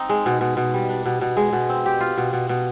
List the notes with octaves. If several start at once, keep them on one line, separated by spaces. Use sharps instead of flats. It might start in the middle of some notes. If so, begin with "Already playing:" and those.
Already playing: C4 D#4
G#3
B2
B2
B2
G3
D4
B2
B2
G#3
B2
C4
G4
F4
B2
B2
B2